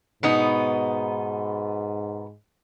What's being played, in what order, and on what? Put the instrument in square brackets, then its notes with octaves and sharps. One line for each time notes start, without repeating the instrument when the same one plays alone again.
[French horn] G#2 [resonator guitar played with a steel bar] B2 B3 D#4